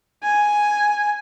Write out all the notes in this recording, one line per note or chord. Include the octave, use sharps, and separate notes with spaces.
G#5